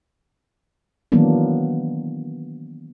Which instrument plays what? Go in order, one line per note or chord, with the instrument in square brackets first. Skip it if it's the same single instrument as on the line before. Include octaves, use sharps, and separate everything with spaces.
[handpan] D#3 E3 F#3 A#3 B3 D4